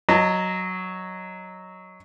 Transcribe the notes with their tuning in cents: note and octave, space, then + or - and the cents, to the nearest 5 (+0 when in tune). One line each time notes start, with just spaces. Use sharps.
F#3 +0 D#5 +0 A5 +40